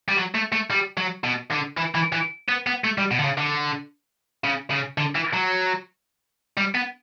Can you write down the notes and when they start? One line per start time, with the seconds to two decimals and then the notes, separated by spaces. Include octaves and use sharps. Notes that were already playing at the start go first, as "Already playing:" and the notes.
0.09 G3
0.17 F#3
0.35 A3
0.53 A3
0.71 G3
0.97 F#3
1.24 B2
1.51 D3
1.77 E3
1.95 E3
2.13 E3
2.49 B3
2.67 B3
2.84 A3
2.98 G3
3.11 B2
3.19 D3
3.24 C#3
3.37 D3
4.44 C#3
4.71 C#3
4.98 D3
5.15 E3
5.34 F#3
6.58 G3
6.75 B3